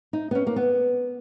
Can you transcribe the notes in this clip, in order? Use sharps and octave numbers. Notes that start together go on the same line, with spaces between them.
D#4
B3
C#4
A#3
B3